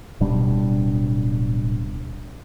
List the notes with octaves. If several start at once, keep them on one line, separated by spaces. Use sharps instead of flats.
D1 B2 G3 D4